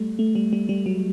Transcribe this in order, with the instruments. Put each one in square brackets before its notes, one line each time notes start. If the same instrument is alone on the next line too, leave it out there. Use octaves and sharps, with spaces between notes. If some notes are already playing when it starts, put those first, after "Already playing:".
Already playing: [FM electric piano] G3 A3
A3
G3
G3
G3
F#3